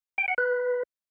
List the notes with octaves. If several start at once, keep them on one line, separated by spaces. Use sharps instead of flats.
G5
F#5
B4